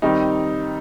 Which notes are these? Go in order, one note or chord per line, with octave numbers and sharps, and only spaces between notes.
D#3 G3 C4 D#4